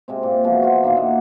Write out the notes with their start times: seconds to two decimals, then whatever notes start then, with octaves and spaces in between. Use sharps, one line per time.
0.08 C3 G#3 C4
0.23 A#2
0.44 B2 E3 F3 G#3
0.62 F4 F#4
0.84 A#2 D3 D#3 A#3
0.96 D#5 E5 F#5 D6